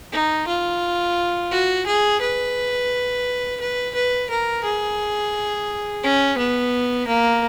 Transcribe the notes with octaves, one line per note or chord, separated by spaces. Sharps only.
D#4
F4
F#4
G#4
B4
B4
B4
A#4
G#4
C#4
B3
A#3